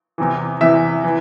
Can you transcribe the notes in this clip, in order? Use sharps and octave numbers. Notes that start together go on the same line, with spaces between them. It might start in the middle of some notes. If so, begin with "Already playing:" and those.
E2 C3 E3
E2 C3 E3 E5
E3